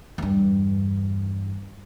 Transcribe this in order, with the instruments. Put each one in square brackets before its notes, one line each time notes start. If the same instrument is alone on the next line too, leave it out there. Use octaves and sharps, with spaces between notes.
[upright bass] E2 G2